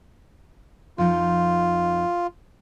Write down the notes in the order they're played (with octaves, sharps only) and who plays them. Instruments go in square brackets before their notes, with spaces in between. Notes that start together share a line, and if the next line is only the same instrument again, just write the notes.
[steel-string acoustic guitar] F2 F3 D#4 [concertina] F4